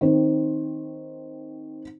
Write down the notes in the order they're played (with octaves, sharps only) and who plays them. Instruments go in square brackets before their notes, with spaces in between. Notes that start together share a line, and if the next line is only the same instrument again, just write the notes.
[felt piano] D#3 C4 C5